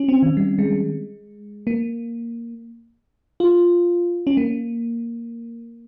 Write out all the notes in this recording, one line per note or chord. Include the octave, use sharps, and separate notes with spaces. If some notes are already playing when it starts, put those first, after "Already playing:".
Already playing: C#4
C4
D#3
G3
G#3
A#3
F4
C#4
A#3